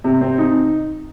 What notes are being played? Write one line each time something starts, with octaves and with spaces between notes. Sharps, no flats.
C3
C4
D#4